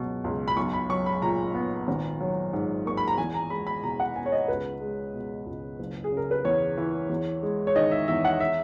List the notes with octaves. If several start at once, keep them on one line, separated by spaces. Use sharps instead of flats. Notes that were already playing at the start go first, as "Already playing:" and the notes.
Already playing: C#2 B2 F#3
C#2
B5
B1 C#6
B5
F#3 C#6
B5
A#2 A#5
B3
G#1
F#3
G#2
A#3 C#6
B5
A#5
E2 G#5
A#5
G#3 B5
B5
B2 A#5
F#5
B3 G#5
C#5
D#5
C#2 B4
G#3
B2
C#2
F#1
G#4
C#3
A#4
B4
E2 C#5
E3
E2
G#3
C#5
D#3 D#5
E5
E2 E5
F#5
E5